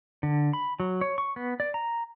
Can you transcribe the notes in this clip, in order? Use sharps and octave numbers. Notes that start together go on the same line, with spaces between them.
D3
B5
F#3
C#5
C#6
B3
D5
A#5